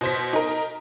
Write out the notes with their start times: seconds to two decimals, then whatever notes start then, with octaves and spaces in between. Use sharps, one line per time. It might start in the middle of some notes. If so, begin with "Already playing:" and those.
0.01 B2 C5 B6
0.33 D#4 A#4